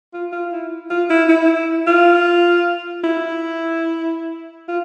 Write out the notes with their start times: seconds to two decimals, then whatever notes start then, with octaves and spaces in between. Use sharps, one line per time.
0.13 F4
0.32 F4
0.52 E4
0.90 F4
1.10 E4
1.29 E4
1.87 F4
3.04 E4
4.68 F4